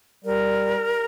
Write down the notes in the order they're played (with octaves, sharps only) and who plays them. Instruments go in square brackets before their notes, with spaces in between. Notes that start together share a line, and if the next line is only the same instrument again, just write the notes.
[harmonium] G3 [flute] A#4